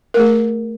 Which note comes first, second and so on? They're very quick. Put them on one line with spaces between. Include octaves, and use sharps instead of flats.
A#4 A3 G#4